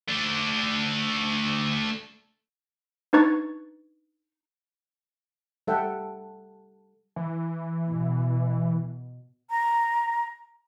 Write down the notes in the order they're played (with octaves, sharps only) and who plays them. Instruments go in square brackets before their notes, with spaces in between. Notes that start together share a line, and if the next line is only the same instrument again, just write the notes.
[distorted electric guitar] A3 D4
[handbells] D4 D#4 B4 C#6 G#6 A6
[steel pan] G3 A4 E5 F#5 G5
[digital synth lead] E3
[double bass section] B2
[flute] A#5